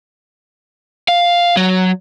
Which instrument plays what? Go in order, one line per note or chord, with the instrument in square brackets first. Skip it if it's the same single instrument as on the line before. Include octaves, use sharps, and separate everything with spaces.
[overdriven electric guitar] F5
F#3